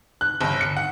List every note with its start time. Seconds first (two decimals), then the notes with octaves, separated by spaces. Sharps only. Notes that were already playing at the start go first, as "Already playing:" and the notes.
0.21 F#6
0.41 G1
0.61 C#7
0.77 F#5